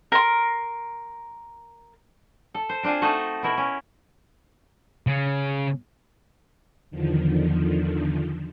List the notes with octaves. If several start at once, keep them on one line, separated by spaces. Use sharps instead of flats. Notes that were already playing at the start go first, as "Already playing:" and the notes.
A#4 C6
A4
C5
C4 D4 F4 C5 G#5
A3 D#4 F#4 D#5 A5
B2 E4 A#4
C#4
C#3 C#4
E2 D3 D#3 F3